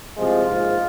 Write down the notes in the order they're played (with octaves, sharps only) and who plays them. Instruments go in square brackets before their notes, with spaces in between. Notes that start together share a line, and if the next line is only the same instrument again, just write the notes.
[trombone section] C2 C3 F3 G#3 F4
A#1 G#2 F3 G#3